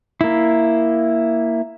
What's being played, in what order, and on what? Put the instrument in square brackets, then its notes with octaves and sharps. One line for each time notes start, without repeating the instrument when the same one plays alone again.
[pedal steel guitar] A#3 E4